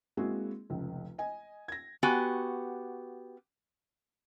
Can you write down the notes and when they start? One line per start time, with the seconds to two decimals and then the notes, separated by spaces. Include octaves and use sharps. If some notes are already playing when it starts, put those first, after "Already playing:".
0.17 G#3 A#3 C4 E4 F#4 G#4
0.70 F1 C#2
1.18 D#5 G#5
1.68 G#6 A#6
2.03 B3 F#4 G4 G#5